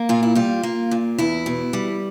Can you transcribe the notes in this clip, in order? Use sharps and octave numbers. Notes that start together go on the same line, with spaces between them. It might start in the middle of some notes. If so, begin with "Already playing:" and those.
Already playing: A#3
A#2 F4
E4
G3 F4
A#3
A#2
E2 E4
B2
G3